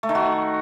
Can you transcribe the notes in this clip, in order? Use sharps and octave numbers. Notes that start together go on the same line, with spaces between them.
A3
D#3
F#4